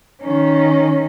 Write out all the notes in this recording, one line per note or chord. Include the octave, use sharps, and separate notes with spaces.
D#3 C#4